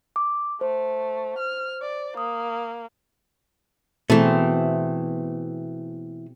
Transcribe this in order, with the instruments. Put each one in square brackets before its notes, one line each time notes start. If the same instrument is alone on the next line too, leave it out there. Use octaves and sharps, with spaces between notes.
[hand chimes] D6
[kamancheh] A3 [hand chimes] C5
[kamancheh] F6
D5
[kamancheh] A#3 [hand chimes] D#6
[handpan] B2 C4 G#4 [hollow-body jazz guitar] E3 A3